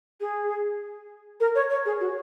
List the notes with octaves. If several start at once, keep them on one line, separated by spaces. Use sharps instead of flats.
G#4
A#4
C#5
C#5
G#4
F#4